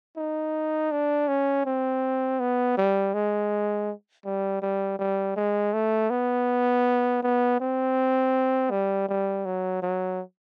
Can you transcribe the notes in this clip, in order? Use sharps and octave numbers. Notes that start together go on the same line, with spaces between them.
D#4
D4
C#4
C4
B3
G3
G#3
G3
G3
G3
G#3
A3
B3
B3
C4
G3
G3
F#3
F#3